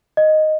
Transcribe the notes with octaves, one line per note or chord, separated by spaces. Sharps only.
D#5